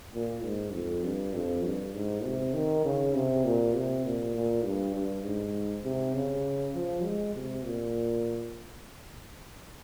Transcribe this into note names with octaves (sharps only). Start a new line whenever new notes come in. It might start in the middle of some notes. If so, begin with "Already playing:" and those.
A#2
G#2
F2
G2
F2
G2
G#2
C3
D#3
C#3
C3
A#2
C3
A#2
A#2
G2
G2
G#2
C3
C#3
F3
G#3
C3
A#2